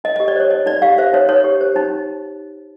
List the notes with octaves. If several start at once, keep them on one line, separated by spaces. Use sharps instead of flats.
D#4 D#5
G4 D#5
D5
C5 C#5
D#4 D#5
D#4 D5
G4 F5
C5 E5
D#4 C#5
D#4 C#5
G4
C5
D#4